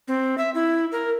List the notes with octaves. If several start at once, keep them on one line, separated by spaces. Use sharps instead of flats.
C4
E5
E4
A#4